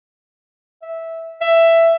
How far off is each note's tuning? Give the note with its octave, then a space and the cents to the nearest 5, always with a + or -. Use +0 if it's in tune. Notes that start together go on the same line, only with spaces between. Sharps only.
E5 -10
E5 +10